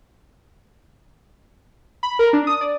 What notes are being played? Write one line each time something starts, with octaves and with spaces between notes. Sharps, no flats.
B5
A#4
D4
D#6
D5